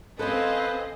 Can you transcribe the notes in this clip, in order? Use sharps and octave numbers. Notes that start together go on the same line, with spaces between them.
C4 C#4 A4 B4 C5 D#5 F5 G#5